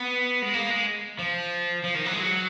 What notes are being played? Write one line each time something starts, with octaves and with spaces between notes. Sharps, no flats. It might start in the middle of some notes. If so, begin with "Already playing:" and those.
Already playing: B3
G#3
A#3
G#3
F3
F3
D#3
F#3
G#3
F#3